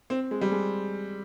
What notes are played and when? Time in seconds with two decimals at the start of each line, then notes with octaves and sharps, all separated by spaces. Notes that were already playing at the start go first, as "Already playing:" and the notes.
0.10 C4
0.31 G#3
0.41 G3
0.52 G#3